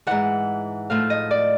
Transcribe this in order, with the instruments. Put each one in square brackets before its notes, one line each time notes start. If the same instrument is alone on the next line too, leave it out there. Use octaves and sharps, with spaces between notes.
[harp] G#2 E3 F#5
A2 F3 F5
D#5
D5